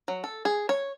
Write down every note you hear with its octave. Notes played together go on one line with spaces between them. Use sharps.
F#3
A4
G#4
C#5